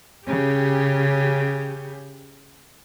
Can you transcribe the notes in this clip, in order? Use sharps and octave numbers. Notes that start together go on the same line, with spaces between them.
C#3 G4